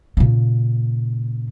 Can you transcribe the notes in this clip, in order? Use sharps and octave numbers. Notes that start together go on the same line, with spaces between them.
A#2 C#3